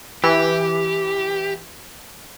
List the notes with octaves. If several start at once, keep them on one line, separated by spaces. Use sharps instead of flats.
E3 G4